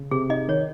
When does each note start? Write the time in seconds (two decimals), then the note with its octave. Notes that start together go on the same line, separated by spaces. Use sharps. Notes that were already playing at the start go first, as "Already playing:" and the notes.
Already playing: C#3
0.11 C3 G#4
0.30 D#4 D#5
0.49 D#3 C#5